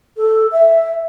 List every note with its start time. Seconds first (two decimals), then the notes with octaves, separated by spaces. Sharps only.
0.17 A4
0.52 E5